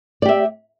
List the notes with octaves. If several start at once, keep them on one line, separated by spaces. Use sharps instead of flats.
G4 D5 E5